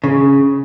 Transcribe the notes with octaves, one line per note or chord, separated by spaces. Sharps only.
C#3